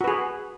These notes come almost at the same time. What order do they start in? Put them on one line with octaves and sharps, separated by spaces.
F#4 B4 G#4